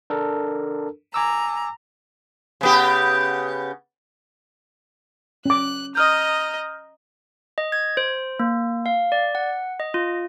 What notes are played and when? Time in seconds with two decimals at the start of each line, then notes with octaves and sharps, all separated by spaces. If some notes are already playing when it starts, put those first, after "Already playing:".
0.10 D4 A4 A#4
1.14 G#5 A#5 D6 E6
2.61 C#3 B3 G4
5.46 C#4 D6 F#6
5.95 D#5 A#5 D#6 F6 G6
7.58 D#5
7.72 G#6
7.97 C5
8.40 A#3
8.86 F5
9.12 D5
9.35 F#5
9.80 D#5
9.94 F4